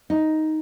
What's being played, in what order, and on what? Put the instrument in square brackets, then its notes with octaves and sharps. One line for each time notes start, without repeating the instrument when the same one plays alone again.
[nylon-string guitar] D#4